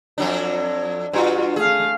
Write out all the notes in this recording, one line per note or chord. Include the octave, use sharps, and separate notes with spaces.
F2 F#3 D4
G2 F4 F#4
A3 G#4 F5